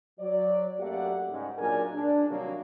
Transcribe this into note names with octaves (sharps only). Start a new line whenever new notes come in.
F#3 D5
F#2 A3 A#3 G4 D5 F#5
G#2 C#3 G3
A#2 F#3 D4 G#4 A#4 G#5
D4
C3 D#3 F#3 G3 A#3